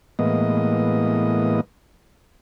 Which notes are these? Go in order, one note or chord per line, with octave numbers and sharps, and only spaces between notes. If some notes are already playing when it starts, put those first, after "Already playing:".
A2 E3 G#3 A#3 B3 D#5